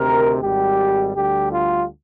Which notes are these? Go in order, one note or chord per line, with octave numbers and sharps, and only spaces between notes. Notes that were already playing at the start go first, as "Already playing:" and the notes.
Already playing: D2 C3 D#3 A#4
G#1 G#2 G3 G4
D2 D3 G3 G4
F4